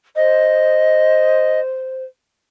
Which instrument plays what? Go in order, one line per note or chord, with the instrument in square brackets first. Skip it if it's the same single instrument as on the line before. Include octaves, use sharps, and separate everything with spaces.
[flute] C5 [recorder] D#5